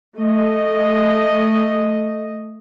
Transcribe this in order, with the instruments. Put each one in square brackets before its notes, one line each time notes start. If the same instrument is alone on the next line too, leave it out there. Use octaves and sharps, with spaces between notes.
[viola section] A3 D#5